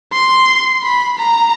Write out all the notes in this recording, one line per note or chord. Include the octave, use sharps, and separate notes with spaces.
C6
B5
A#5